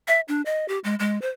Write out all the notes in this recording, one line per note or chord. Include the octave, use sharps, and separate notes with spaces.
E5
D4
D#5
G4
G#3
G#3
C5